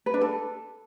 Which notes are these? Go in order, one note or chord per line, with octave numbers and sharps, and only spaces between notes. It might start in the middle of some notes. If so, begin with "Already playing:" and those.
B4
D4
A4